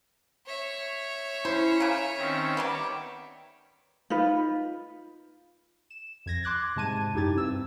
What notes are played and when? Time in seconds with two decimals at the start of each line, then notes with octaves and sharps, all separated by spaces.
0.47 C#5 E5
1.45 C#4 E4 C5
1.80 C#3 A#3 G#5
2.17 D#3 C4 C#4
2.57 D#3 G3 B3 D6
4.10 D#4 F4 B4
5.90 E7
6.26 F2 G#6 A#6
6.43 C6 D6 F#6 G#6 A6
6.76 G#2 C3 G#3 A5 G#6 D#7
7.14 F#2 D#4 E4 G4 G#6 A6
7.35 G2 C4 E6